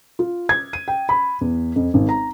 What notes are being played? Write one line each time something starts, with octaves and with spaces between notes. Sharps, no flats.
F4
G#6
D#7
G5
B5
E2
F2
G#1
A#5